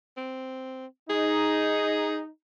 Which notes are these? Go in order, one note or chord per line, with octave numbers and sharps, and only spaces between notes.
C4
D#4 G#4